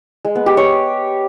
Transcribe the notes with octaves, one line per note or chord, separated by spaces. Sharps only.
G#3
B3
G4
C#5